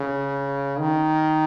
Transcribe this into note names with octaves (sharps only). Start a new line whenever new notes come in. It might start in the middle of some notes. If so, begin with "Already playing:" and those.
Already playing: C#3
D#3